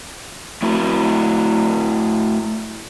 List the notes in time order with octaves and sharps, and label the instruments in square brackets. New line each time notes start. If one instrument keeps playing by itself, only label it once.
[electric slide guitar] A3 E4 F#4